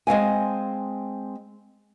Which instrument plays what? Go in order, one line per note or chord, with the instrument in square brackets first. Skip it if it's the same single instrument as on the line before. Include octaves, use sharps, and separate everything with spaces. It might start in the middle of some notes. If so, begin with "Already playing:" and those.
[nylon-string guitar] G#3 C4 F5 G#5